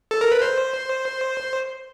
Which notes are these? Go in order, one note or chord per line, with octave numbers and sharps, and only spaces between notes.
A4
A#4
B4
C5